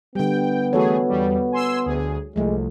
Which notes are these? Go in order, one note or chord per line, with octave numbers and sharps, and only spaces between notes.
D3 G3 B3 G5
E3 A3 F#4 G#4 A4 C#5
E2 G3
G#5 C6 E6
D2 G#4
C2 F3 G#3 A3